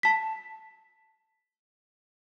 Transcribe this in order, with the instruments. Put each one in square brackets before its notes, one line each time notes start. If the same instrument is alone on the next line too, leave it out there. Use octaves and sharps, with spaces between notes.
[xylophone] A5 B6